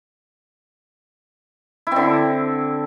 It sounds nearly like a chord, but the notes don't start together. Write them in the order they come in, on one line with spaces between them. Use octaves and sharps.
E4 C4 D3